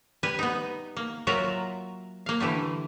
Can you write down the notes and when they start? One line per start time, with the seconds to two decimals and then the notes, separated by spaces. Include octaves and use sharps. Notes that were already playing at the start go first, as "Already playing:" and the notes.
0.23 G3 B4 G#5
0.39 B3 D#4
0.97 A#3
1.27 F#3 F4 F#4 A#4 E5
2.26 A#3 F5
2.40 D3 E3 G3 A3